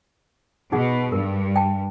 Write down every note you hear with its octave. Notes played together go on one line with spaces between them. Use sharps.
B2 D#4 G#4 F#5
G2 A#4
G5 A5